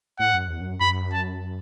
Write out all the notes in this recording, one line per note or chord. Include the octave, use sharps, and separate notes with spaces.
A2 F#5
F#2
E2
F#2
F#2 B5
A5